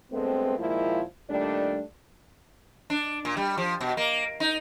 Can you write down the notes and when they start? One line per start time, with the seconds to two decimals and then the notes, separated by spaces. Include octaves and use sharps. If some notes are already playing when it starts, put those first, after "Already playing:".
0.12 G2 G#3 A3 B3 C4
0.59 A#2 D#3 F3 G#3 A#3 E4
1.30 A#2 D#3 G3 A3 D4
2.90 D4
3.25 A#2
3.37 G3
3.57 F3
3.81 B2
3.97 A#3
4.40 D#4